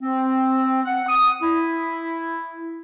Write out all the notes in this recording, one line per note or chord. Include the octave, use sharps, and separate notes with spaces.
C4
F#5
D#6
E4